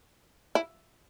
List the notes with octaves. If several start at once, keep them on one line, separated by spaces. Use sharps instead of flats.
E4